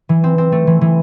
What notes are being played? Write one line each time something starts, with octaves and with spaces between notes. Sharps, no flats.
E3
C4
C4
A3
E3
E3